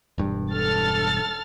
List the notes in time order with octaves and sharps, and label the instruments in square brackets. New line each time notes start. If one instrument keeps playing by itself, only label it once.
[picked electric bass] E1 G2
[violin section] A4 F6 A6